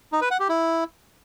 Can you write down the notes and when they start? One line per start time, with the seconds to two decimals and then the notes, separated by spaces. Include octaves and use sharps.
0.12 D#4
0.21 B4
0.31 F#5
0.40 G4
0.49 E4